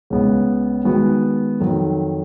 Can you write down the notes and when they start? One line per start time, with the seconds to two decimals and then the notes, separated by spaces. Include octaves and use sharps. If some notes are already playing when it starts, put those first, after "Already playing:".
0.10 C#2 C#3 G#3 B3
0.85 D#3 G#3 B3 F#4
1.60 F2 D#3 F#3